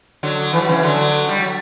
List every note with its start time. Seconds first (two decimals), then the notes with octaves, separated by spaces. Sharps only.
0.23 D3 F#3
0.53 E3
0.60 F#3
0.68 C#3 E3
0.83 D3 F#3
1.29 G3
1.39 F#3